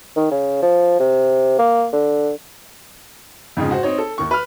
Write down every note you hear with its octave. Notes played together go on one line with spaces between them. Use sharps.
D#3
C#3
F3
C3
A#3
D3
F2 G#2 C#3 F3
F#4 C5
C4 D#4 C#5
A4
D#2 D#3 C#6
B4 F6